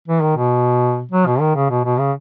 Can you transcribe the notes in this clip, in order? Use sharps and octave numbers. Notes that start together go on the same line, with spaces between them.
E3
D#3
B2
F#3
B2
D#3
C#3
B2
B2
C#3